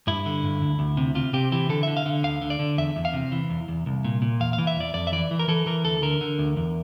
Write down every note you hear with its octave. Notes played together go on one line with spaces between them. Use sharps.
G2 E4
D3
G2
D2
D2
C3
C3 F4
C3 G4
E3 G4
D3 A4
D3 E5
F5
D3
D2 F5
D3
D5
D3
E2 E5
E2
F5
C3
E3
E2
E2
C2
A#2
A#2
E2 F5
F5
E3
E5
E2 D5
F2 D5
E5
E3 D5
E3
A#4
E3 A4
E3 A#4
D2 A4
D3 A#4
D3
D2
E2